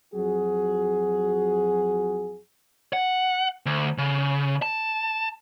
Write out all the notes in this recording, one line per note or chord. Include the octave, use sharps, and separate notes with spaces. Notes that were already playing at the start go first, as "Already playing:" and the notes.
F2 F#3 F#4 G#4
F#5
D2
C#3
A5